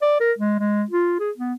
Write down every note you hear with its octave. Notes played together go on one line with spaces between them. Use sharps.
D5
A#4
G#3
G#3
F4
G#4
B3